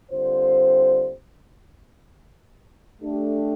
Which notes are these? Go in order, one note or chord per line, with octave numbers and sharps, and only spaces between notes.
D3 G3 C4 F4 C5
A3 D4 G4